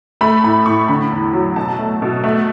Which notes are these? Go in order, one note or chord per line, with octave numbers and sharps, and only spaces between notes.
A3 B5
A2 B5
A2 C#6
D3 B5
E2
F#3
B2 A5
A3
B2
A3